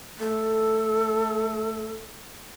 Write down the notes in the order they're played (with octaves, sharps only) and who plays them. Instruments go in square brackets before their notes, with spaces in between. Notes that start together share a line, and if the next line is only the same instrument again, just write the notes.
[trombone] A3 [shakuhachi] A4